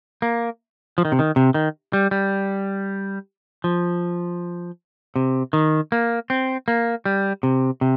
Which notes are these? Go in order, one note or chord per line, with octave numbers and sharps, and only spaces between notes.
A#3
F3
D#3
C3
D#3
C3
D#3
G3
G3
F3
C3
D#3
A#3
C4
A#3
G3
C3
C3